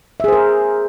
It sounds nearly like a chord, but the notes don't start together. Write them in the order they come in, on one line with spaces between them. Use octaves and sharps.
E5 G#4 C5 A#4